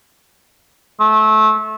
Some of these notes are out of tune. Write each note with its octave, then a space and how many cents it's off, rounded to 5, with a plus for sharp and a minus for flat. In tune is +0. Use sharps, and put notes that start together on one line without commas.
A3 -25